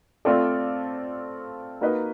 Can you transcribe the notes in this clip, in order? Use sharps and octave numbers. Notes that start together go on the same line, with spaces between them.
A3 C4 F4 A4 D5
A#3 D#4 F#4 B4 D#5